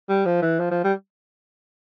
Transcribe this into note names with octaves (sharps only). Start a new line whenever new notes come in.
G3
F3
E3
F3
F3
G3